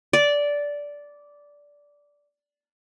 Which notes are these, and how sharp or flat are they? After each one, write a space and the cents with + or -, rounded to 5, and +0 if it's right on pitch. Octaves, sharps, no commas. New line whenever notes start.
D5 -10